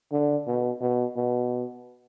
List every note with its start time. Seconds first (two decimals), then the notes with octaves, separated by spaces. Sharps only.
0.12 D3
0.47 B2
0.81 B2
1.16 B2